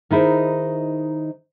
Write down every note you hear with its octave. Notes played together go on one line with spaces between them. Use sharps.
D#3 D#4 E4 G#4 C5